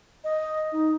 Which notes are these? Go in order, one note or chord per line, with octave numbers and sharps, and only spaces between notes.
D#5
D#4